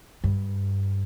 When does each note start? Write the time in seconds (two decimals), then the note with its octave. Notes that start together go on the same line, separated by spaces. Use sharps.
0.24 G2